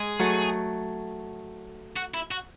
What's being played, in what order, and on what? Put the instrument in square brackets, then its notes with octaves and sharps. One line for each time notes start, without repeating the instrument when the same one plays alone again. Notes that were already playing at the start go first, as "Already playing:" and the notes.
Already playing: [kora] G#3 [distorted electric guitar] G#4
[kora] F#3 A3
[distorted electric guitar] F#4
E4
F#4